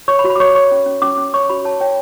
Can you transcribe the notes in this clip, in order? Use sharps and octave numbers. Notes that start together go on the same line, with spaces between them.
C#5 C#6
B5
F#4
B5
D6
C#5 C#6
C#5 C#6
C#4
C#4
C#4 D6
C#4 D6
C#5 C#6
F#4 B5
C#5 A5
C#5 G5